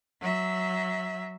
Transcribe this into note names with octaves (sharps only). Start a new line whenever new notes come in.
F#3 E5